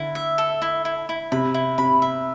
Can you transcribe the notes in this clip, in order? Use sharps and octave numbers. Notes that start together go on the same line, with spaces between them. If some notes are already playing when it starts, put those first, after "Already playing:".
Already playing: D3 E4
E5
A4
E4
E4
E4
C3 B5
E4
C3 B5
E5